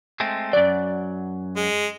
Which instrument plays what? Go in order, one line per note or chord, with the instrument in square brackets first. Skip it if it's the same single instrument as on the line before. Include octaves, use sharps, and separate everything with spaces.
[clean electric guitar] G#3 A3 C4
[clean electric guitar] F#2 F#3 [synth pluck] D5
[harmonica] G#3